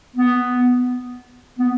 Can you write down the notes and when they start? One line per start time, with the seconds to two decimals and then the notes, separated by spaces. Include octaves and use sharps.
0.16 B3
1.59 B3